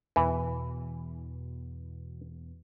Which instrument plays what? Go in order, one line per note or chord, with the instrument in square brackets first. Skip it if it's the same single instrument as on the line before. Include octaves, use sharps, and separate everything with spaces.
[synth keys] E2 B2 [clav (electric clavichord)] E3